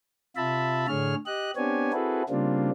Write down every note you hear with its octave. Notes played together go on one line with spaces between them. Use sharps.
C3 F4 E5 A5 B5
A2 D3 G#4 C#5 F6
G4 D#5 F#6
B3 C4 D4 G4 C#5 G#5
C4 E4 F#4 G#4 A4 B4
C#3 G3 A#3 C4 D4 F4